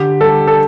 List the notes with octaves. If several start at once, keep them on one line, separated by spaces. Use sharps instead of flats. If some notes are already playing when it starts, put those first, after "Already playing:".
Already playing: D3 G4
G3 A4
A4